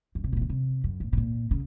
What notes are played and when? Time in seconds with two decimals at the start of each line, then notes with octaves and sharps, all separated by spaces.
0.15 F#2
0.24 C3
0.32 A#2
0.36 D#3
0.41 C#3
0.49 C3
0.84 F#2
1.00 A2
1.13 C3
1.17 A#2
1.51 C#3